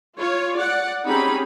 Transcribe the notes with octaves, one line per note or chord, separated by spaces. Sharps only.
F4 C#5
D5 F#5
C4 C#4 D#4 G4 G#4 B5